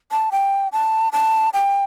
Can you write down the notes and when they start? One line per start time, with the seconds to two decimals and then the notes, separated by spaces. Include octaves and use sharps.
0.12 A5
0.32 G5
0.72 A5
1.13 A5
1.54 G5